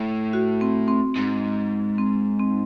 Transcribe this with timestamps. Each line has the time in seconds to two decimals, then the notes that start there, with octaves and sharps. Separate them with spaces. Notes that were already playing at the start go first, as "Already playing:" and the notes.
Already playing: A2
0.33 F#4
0.61 C4
0.88 C4
1.16 G#2 C4
1.98 C4
2.40 C4